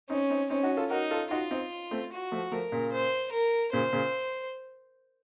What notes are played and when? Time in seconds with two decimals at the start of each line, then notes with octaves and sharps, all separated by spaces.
0.09 C4 C#4 D#4
0.30 C4 D#4
0.50 C4 C#4 D#4
0.63 D#4 F#4
0.77 F4 A4
0.90 D#4 F#4 A#4
1.11 F4 A4
1.31 D#4 F4 F#4
1.51 C4 D#4
1.91 A3 C4
2.12 F#4
2.32 F3 A3
2.52 F3 A3 A#4
2.72 A#2 C#3
2.92 C5
3.32 A#4
3.73 A#2 C#3 C5
3.93 A#2 C#3